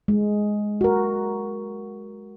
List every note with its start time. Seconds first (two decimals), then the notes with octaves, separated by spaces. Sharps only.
0.08 G#3
0.81 F#4 A#4